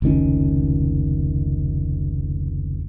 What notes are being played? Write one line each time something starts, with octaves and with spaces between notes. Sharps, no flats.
F1 C#2 D#3 C#4